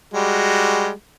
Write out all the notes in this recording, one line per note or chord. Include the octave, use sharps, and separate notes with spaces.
G3 G#3 F#4